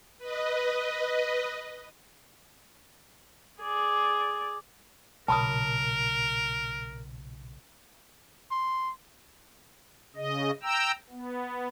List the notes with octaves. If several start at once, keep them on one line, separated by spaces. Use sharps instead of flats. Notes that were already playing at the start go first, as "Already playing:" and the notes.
B4 D#5
G#4 D5
B1 A#2 C#3 A#4 A5 B5 D#6
C6
C#3 D#5
G5 A#5 E6
B3